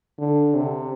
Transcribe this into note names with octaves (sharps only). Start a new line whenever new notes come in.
D3
C3